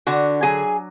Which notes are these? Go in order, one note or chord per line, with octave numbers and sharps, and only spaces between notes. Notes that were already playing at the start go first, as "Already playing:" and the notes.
D3 F#4 F#5
F#3 G#4 G#5